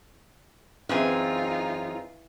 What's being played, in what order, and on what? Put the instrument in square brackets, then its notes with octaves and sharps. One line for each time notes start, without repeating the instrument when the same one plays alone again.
[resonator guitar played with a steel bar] F#2 C4 G#4 [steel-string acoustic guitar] E3 [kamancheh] D#4 F4